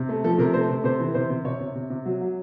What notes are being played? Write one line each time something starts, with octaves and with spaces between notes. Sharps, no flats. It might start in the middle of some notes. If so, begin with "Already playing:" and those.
Already playing: C3
A3
F3 A4
C3 A#4
A3 C5
C3
C3 C5
E3
C3 C5
C3
C3 C#5
C3
C3
C3
F#3
F#3